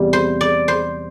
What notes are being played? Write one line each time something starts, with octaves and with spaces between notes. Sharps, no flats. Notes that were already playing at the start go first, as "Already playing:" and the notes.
Already playing: E2 C3 G3 G4
C5
D5
C5